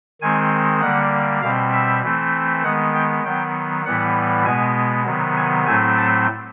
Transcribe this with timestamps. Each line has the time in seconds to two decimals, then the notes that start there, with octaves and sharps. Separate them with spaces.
0.21 D#3 G#3 C4 G#5
0.81 D3 G3 A#3 F#5
1.42 B2 G3 C4 F5
1.73 E5
2.02 E3 A3 C4
2.63 D#3 G#3 B3 F#5
2.94 G5
3.23 D#3 F#3 B3 G5
3.85 A2 E3 G3 B3 F#5
4.45 B2 G#3 B3 G#5
5.05 C3 D#3 F#3 B3
5.37 G#5
5.66 A2 F#3 A3 C4 G#5
5.97 A5